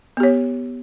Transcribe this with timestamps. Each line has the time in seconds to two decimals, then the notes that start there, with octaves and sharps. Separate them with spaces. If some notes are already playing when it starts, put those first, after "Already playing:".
0.17 B3
0.20 G4
0.23 C#5